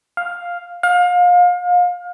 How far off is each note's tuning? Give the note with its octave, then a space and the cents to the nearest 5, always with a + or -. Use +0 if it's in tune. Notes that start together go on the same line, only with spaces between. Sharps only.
F5 +5
F5 +30